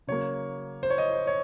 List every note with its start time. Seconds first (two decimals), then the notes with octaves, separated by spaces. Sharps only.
0.07 C#3 F#3 A#3 C#5
0.83 C5
0.90 C#5
0.98 D#5
1.13 C5
1.27 C#5